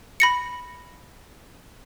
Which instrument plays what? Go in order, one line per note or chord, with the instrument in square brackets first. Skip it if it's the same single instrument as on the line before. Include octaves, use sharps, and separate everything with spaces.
[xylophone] B5 A#6 C#7